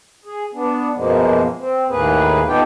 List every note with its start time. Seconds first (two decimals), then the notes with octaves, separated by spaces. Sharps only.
0.25 G#4
0.54 B3 D4
0.95 F#2 B2 F3 G#3 A#3
1.59 C4
1.89 D#2 A2 A#3 G#4 B4
2.47 B3 D#4 F4 G4 A4 G5